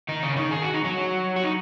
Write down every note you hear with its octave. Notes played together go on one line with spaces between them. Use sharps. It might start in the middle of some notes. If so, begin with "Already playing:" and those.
D#3 D#4
C#3 C#4
D#3 D#4
G#4
F#4
D#4
F#3 F#4
F#4
D#4